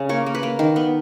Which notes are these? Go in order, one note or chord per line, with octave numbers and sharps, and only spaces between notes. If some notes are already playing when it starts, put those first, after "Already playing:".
Already playing: C#3
A#3 C#5
A#3
B4
A#3
D#3
B3